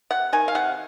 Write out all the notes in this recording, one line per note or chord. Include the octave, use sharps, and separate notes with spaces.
C3 F#5
D#3 G#5
F5
C3 F#5